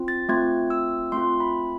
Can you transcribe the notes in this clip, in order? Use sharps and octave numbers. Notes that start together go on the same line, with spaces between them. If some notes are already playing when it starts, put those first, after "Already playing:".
Already playing: C4 F4
A6
A3 C4 F4 G#6
E6
A3 C4 F4 C6
B5